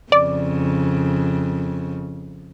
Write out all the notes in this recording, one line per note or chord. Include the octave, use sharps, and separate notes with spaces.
F2 C#3 D5